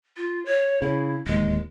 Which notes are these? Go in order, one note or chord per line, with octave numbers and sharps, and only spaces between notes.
F4
C#5
C#3 E4
D1 D#2 G#3